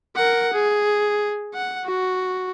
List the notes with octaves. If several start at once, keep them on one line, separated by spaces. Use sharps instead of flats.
A#4 F#5
G#4
F#5
F#4